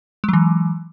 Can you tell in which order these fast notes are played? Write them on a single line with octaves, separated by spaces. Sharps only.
G#3 F#3 E3